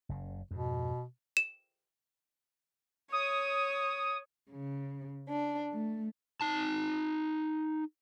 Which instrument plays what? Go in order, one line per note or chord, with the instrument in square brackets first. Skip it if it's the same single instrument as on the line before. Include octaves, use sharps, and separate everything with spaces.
[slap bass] F#1 C#3
[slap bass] F2 G#2 [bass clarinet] B2
[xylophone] E7
[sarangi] C#5 [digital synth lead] D#6
[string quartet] C#3
D4
A3
[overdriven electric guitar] D#4 A5